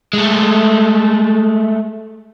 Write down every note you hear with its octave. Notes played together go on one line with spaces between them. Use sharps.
G#3 A3